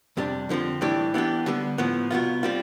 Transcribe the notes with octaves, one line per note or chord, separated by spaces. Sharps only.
F2 C3 G3 D4
F2 D3 F3 C4
A2 E3 G3 D4 G4
E3 B3 D4 G4
D3 G3 B3
A2 F3 B3
C2 B2 B3 F4
G3 C4 F4